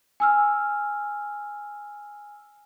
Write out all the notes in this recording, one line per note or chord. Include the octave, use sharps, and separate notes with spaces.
G#5 E6 F6